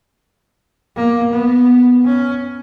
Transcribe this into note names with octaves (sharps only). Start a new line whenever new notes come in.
A#3
B3
C#4